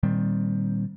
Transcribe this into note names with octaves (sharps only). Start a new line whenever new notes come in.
A#2 D#3 G3 C4